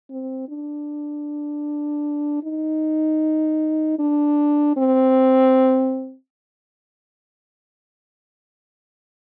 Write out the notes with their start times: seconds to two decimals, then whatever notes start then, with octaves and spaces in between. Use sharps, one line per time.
0.10 C4
0.49 D4
2.44 D#4
3.99 D4
4.77 C4